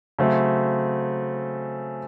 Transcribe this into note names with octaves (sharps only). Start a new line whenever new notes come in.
C#3 F#3 A3 C4